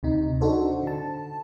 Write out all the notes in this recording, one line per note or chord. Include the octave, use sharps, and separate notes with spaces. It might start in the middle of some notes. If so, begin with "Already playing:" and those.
D2 C3 D#4
D4 D#4 F#4 A4 C5
D3 A5